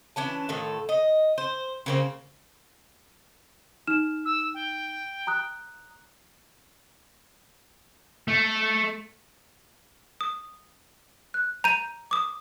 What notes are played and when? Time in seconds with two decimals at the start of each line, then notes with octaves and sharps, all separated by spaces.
0.16 E3 C#4 D4 A5
0.49 A2 D#3 F4 A4
0.89 D#5
1.38 C5
1.86 C#3 A#3 C4
3.87 D#4 F6 E7
4.25 E6
4.54 G5
5.27 A#5 D#6 F#6
8.28 A3
10.21 D#6
11.34 F#6
11.64 A#5 G6 D#7
12.11 D6 D#6